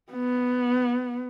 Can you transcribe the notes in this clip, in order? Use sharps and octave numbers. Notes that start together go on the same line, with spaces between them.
B3